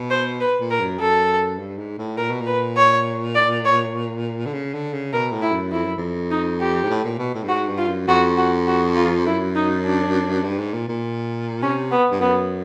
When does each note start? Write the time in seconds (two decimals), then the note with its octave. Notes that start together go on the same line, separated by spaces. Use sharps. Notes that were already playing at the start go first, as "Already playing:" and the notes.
Already playing: B2
0.10 C5
0.40 B4
0.60 A#2
0.70 A#4
0.80 F#2
1.00 F#2 A4
1.59 G2
1.78 G#2
1.98 A2
2.17 A#2 A#4
2.30 B2
2.41 A#2
2.46 B4
2.77 C#5
3.35 D5
3.65 C#5
4.46 D3
4.53 C#3
4.74 D3
4.93 C#3
5.13 B2 A#4
5.32 A2
5.42 E4
5.52 F#2
5.72 F2 E4
5.84 F#2
5.97 F2
6.31 D#4
6.60 G4
6.84 G#2
6.90 A2
7.04 A#2
7.19 B2
7.34 A2
7.43 G2
7.48 G#2 F#4
7.68 G2
7.78 F4
7.88 F#2
8.07 F2 F#4
8.37 F#4
8.67 F#4
8.96 F4
9.25 F#2 E4
9.55 D#4
9.85 D4
10.44 G2
10.59 G#2
10.74 A#2
10.88 A#2
11.62 C3 C#4
11.91 B3
12.11 G2
12.21 F#2 B3